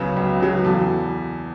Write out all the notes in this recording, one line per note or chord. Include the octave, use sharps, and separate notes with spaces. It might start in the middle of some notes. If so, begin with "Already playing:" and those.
Already playing: C#2 C#3 F#3 B3 B4
C#2
C#3 F#3 B3
E2 A4